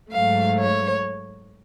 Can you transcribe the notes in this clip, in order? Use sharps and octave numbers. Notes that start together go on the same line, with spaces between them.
G#2 F#3 A3 F5
C#5